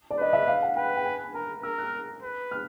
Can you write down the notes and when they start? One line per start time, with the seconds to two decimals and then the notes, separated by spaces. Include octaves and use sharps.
0.10 D5
0.19 B4 D#5
0.33 E5
0.48 F5
0.62 F#5
0.76 B4 G5
0.97 G5
1.05 G#5
1.24 B5
1.35 A#4 A#5
1.63 A#4 E6
1.78 F#6
1.84 F6
2.22 B4
2.51 F6